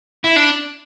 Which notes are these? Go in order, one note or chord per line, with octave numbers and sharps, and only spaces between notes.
E4
D4